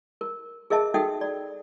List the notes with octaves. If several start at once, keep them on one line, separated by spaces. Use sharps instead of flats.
A#4
G#4 A#4 D#5 E5 A5
D#4 F#4 A4 E5 G5 D#6
D5